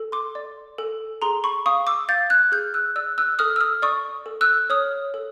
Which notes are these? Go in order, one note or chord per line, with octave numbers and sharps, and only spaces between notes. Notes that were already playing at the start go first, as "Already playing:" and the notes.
Already playing: A4
C6 D6
D5
A4
G#4 A#5 C6
B5 C#6
F5 C#6 D#6
D6 E6
F5 G6 A6
F#6 G#6
G#4 F6 G6
E6 F#6
D5 E6 F#6
E6 F#6
A4 D#6 F6
E6
D#6 F6
D5 C#6 D#6
A4
E6 F#6
C#5 D#6 F6
A4